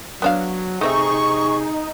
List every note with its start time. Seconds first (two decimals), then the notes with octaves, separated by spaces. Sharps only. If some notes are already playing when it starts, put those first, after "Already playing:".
0.22 F#3 B3 D4 F5
0.81 C3 A3 C4 D#4 G#4 E5 C#6